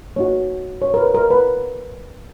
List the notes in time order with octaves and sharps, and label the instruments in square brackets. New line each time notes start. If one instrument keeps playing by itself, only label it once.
[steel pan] A#3 D#4 F#4 C#5
C#5
A#4
B4
A#4
B4